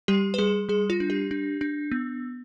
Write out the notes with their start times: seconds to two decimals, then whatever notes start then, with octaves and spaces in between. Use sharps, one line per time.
0.08 G3 G4
0.34 B4
0.38 G3 G#4
0.69 G3 G#4
0.90 F4
1.00 D4
1.10 G4
1.31 D4
1.61 D4
1.92 B3